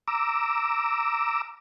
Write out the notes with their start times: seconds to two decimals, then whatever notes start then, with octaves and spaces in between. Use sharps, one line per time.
0.08 A#5 D6 E6